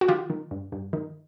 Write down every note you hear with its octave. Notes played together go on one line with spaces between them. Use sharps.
F#4
D#3 F4 G4
D#3
G2
G2
D#3